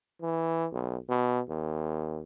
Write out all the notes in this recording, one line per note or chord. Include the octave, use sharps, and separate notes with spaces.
E3
B1
B2
D#2